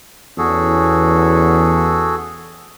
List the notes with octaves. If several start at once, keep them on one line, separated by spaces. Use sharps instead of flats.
E2 C#4 F#4 G#4 A4